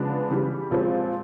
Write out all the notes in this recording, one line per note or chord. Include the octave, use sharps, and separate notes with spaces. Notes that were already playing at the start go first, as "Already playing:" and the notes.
Already playing: C#3 F3 G#3 B3 D4
C#3 E3 G3
A#2 F3 G#3 C4